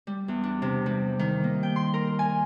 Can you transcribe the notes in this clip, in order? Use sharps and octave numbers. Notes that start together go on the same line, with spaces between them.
G3
E2
D4
C3
G3
D#3
A#3
G5
C6
A#4
G#5